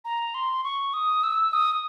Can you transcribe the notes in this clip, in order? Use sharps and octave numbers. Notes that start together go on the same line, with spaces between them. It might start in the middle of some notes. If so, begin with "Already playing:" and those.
A#5
C6
C#6
D#6
E6
D#6